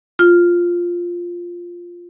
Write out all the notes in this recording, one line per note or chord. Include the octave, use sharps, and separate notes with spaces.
F4 F6